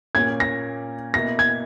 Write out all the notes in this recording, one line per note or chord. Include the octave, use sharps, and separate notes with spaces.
A#2 A#3 C#4 G#6
A#6
B2 A#3 E4 A#6
G#6